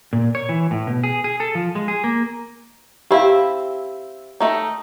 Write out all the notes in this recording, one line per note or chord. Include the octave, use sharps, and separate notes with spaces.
A#2
C#5
E3
A2
B2
G#4
G#4
A4
F3
G#3
G#4
A#3
C4 E4 G4 F5
D#3 A3 D#4